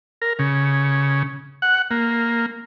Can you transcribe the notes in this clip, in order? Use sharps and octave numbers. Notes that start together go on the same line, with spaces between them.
A#4
C#3
F#5
A#3